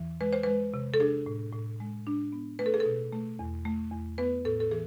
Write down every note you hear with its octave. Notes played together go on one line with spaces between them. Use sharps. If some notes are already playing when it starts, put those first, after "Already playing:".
Already playing: E2 E3
G#3 B4
C5
G#3 B4
C3
A4
D4 G#4
A2
A2
G#3
D4
B3
A3 B4
A4
G#4
A4
B2
A3
E2
A3
E2
B3 B4
A2 A4
A4
E3 G#4